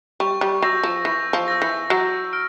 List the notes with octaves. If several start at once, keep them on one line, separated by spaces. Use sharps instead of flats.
G3 C#6
G3
F#3 E6 G6 A#6
F3
E3 C#6
F3
E6 G6 A#6
E3
F#3 C#6
F6 D7